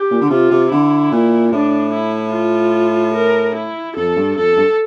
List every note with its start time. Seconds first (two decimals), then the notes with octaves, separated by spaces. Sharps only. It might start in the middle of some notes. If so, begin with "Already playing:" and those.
Already playing: G4
0.10 A#2
0.22 D3
0.30 C3 F4
0.50 C3
0.71 D3 E4
1.12 A#2
1.52 A2 D4
1.93 E4
2.34 F4
3.14 A#4
3.56 E4
3.96 F2 A4
4.16 G2
4.36 F2 A4
4.56 G2